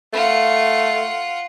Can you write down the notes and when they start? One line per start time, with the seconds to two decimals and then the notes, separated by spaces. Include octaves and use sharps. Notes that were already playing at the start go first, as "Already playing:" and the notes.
0.13 A3 F4 F#5